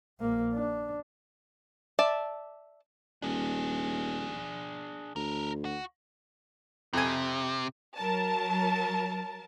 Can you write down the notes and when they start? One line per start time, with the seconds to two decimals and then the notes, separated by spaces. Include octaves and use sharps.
0.20 A#1 A#3
0.53 D4
1.99 D5 E5 A5
3.22 D#1 D4 G#4
5.16 D2 A4 A#4
5.65 F#4
6.93 F2 C3 G#5
7.97 F#3 A#4 A5